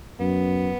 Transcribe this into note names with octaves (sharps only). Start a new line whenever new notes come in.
F#2 B3